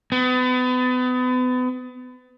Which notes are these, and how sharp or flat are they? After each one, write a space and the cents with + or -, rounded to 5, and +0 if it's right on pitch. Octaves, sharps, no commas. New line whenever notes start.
B3 +35